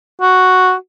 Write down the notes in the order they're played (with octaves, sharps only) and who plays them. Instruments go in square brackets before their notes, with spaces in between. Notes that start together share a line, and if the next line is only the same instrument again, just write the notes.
[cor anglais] F#4